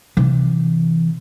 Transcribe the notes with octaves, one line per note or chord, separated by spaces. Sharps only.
C3 E3